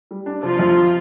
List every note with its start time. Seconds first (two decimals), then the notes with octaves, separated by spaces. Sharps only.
0.11 G3
0.26 D4
0.42 C3 F3 F4
0.59 F2